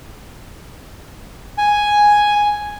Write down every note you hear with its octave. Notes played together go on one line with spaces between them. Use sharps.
G#5